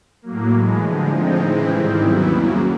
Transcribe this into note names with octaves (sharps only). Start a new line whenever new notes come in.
A2 F#3 A#3
A2 E3 G#3
D3 F3 G#3
A2 F3 G#3 C4 D#4
C#3 E3 G#3 C4 E4
G#2 D#3 G3 C4
D#2 C#3 F#3 B3 E4
F#2 C#3 F#3 A#3